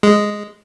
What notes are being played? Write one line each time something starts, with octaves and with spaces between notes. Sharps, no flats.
G#3